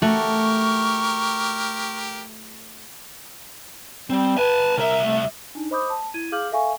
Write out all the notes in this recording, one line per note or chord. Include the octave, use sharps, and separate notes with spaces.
A3 F#4 G4 A#4 C#6
G3 C4
B4 G#5 A5
C2 A#4 E5
A3
D4 D#4
C5 D#5 B5 D6 D#6 G6
A5
E4 G#6 D#7
G#4 F5 D6 F6 G6 F#7
A4 E5 F5 G#5 C#6